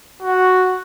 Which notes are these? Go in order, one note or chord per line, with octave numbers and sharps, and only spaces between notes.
F#4